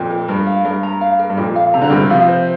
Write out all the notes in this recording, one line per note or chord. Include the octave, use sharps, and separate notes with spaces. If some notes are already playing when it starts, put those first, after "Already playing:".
Already playing: F2 A#2
A#4
G2 A#4
F5
G2 A#4
A#5
F5
A#4
G2
F2 A#2 A#4
F5
C3 A#5
D3
G2 C3 A#4
C3 F3 F5
C5